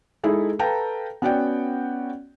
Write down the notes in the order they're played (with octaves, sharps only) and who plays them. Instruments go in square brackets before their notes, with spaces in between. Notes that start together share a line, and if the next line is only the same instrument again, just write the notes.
[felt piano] G#3 D#4 E4 G#4 A4
A4 B4 F5 G5 A5 A#5
B3 C#4 F#4 D5 F#5 G5